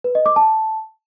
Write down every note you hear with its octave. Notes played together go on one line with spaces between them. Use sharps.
B4
D#5
D6
A5